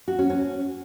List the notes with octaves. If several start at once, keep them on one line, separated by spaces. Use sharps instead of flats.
F#4
C#4
C#4